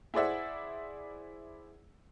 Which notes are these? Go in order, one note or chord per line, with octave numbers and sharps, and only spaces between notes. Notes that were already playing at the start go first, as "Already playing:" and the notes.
E4 G#4 C5 D5 E5 F#5